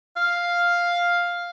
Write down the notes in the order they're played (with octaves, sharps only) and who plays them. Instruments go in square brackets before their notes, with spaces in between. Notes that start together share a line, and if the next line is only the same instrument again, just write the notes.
[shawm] F5